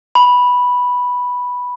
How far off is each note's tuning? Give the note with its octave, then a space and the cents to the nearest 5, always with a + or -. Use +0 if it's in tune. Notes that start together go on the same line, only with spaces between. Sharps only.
B5 -5